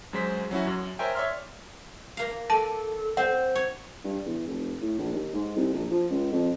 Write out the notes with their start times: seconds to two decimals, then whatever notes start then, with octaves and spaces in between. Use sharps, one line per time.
0.13 F#2 F#3 G#3 C5 B6
0.51 F#3 C#4 E4 F#4
0.67 F#2
0.99 A#4 C5 C#5 E5 G5 G#5
1.15 C#5 D5 E5 C6 F6
2.17 A#3 F5
2.50 A4 D5 A5
3.17 C4 F#5
3.55 C#5
4.04 G2
4.26 E2
4.47 F1
4.81 A2
4.98 A#1
5.13 D#2
5.34 G#2
5.56 C2
5.73 A#1
5.91 F3
6.10 C#2
6.32 F2